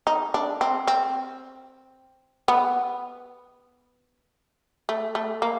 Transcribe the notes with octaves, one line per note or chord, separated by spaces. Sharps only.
D#4
D4
C4
C4
B3
A3
A3
A#3